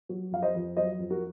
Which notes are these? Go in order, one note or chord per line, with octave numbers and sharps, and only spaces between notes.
F#3
F2 F5
C5 D#5
F2
F#3 C5 D#5
F2
F#4 A#4